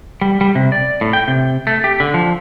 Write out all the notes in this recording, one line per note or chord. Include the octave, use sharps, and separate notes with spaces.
G3
G3
C3
D5
A2
G5
C3
A3
G4
D3
F3